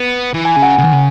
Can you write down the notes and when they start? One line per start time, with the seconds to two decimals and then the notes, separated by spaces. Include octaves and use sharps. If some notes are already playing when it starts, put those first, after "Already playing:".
Already playing: B3
0.34 E3
0.45 G#5
0.56 C#3 G#5
0.62 F#5
0.68 G#5
0.78 C#3
0.85 D#3
0.93 C#3